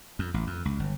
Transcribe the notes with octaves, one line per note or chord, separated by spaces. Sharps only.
F2
A1
F2
C#2
G1